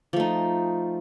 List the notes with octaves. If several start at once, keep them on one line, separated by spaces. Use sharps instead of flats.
F3 A3 D#4